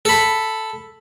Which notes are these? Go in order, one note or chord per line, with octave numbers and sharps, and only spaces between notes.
A4 B5